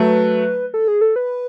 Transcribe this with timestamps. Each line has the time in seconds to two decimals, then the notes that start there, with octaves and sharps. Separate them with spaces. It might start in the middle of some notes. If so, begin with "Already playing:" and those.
Already playing: F#3 A3 B4
0.74 A4
0.88 G#4
1.01 A4
1.16 B4